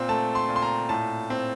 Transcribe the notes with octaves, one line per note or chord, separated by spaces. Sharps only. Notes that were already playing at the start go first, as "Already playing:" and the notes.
Already playing: A#2 C4 C6
A3 A5
C6
A#2
C6
A#5
A2 A5
C4